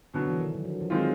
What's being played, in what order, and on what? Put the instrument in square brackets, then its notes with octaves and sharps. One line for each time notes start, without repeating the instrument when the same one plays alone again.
[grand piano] B2 F#3 B3 [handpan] D3
[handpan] E3
D#3
F#3
F3
F3
[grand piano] D#3 G#3 C4 F4 [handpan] F#3